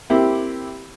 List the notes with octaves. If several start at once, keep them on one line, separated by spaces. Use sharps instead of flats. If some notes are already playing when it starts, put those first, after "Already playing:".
A#3 C4 E4 G4